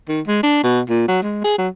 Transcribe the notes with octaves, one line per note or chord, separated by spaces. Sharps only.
D#3
G#3
D4
B2
A#2
F#3
G#3
G#4
F#3